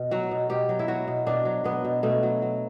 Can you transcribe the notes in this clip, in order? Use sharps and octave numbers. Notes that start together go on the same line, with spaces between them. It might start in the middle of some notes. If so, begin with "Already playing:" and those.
Already playing: B2
F#3 F#4
B2
B2 G4
F#3
E4
F#3 F#4
B2
B2 D4
F#3
F#3 B3
B2
B2 A3
F#3
F#3